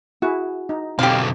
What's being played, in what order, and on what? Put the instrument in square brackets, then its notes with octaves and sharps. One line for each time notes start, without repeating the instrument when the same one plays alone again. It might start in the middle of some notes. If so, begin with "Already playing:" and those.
[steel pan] E4 G#4 [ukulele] F#4
[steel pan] D#4
[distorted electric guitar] B1 D3 [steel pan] C4 [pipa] G4 F5